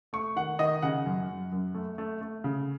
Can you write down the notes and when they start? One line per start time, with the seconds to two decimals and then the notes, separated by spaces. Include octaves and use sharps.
0.13 A3 C#6
0.36 D#3 F#5
0.59 D#3 D#5
0.82 C#3 F#5
1.06 F#2
1.28 F#2
1.52 F#2
1.74 A3
1.98 A3
2.21 A3
2.44 C#3